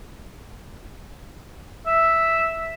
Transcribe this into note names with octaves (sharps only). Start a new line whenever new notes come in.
E5